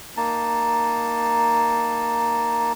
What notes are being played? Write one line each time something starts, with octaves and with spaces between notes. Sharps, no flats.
A#3 D#4 A5